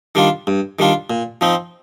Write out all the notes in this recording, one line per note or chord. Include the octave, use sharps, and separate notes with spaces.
D#3 G3 D4 F4
G2
D#3 G3 D4 F4
A#2
F3 C4 D#4